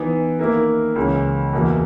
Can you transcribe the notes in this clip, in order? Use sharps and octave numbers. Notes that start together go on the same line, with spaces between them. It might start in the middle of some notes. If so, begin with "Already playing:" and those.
Already playing: E3 B3 D#4
D#3 A#3 E4 A#4
C#2 C#3 E3
E2 B2 A#3 E4